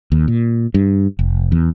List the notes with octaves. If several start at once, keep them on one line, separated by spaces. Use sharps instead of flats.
D#2
A#2
G2
F1
E2